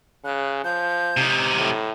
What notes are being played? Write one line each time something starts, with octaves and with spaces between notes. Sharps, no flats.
C#3 F#6
F3 G6
C3 D#4
A2